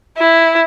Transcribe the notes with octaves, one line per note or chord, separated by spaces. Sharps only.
E4